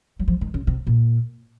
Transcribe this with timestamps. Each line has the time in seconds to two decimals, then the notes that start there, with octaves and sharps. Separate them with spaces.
0.19 F#3
0.28 F3
0.41 D#3
0.54 C#3
0.67 C3
0.87 A#2